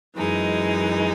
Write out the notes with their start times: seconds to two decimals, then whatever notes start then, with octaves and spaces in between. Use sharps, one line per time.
0.16 F#2 E3 G#3 D#4